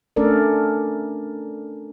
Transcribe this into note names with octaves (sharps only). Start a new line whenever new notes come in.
A3 C#4 D4 A4 A#4 D5